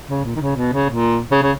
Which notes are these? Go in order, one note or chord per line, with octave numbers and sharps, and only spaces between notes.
C#3
A#2
D#3
C#3
B2
C#3
A#2
C#3
C#3